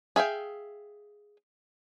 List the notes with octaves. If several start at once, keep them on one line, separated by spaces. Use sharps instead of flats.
G#4 E5 F5 G5